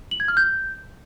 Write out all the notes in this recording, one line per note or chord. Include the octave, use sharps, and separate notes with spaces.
F#7
G#6
F6
G6